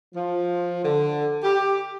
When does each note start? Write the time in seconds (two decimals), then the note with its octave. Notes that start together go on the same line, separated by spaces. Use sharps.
0.15 F3
0.84 D3
1.44 G4